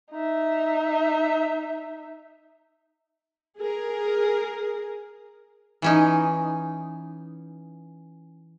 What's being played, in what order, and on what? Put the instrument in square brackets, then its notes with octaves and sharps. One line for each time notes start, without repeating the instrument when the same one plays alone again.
[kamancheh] D#4 E5
[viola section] G#4 A#4
[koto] E3 C#4 D#4